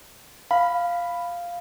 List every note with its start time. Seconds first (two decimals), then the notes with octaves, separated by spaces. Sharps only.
0.51 F5 B5